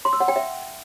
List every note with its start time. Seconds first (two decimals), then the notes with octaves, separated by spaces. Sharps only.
0.05 C6
0.13 E6
0.20 F#5
0.28 G5
0.36 E5